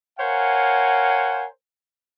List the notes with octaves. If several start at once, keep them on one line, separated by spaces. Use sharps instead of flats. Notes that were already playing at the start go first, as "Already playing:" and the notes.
A#4 C5 C#5 F5 F#5 G#5